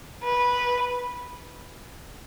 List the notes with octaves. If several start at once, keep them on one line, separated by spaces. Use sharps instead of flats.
B4